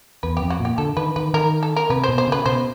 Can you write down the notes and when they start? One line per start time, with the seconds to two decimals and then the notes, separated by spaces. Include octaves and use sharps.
0.23 E2 B4
0.37 F2 G4
0.50 F#4
0.60 A#2
0.65 G4
0.78 D3 A4
0.97 D#3 B4
1.16 D#3 B4
1.34 D#3 A#4
1.63 A4
1.76 A#4
1.90 C3 B4
2.04 C5
2.09 B2
2.18 C5
2.27 C#3 B4
2.46 B2 C5